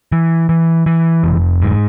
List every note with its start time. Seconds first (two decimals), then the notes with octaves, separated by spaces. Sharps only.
0.12 E3
0.49 E3
0.86 E3
1.24 F1
1.62 G#2